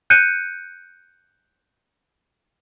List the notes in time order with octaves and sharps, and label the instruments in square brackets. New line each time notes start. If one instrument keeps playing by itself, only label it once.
[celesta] F#6 G6 C#7 D#7